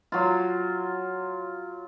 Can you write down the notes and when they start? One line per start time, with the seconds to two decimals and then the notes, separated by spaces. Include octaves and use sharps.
0.12 F#3 F4